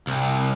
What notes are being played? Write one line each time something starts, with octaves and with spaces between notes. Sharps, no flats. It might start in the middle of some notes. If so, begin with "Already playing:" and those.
C2